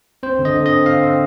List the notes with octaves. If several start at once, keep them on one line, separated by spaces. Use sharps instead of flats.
C4 C5
D3
D#5
D3
C4 D#5
C4 F5
C4